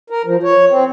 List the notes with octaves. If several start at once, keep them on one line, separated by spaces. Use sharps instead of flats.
A#4
F3
C#5
C4